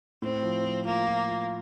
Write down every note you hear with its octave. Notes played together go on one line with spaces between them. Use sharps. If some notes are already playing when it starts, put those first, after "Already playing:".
A2 C4
F3
F3
A#3 F4
F4
F4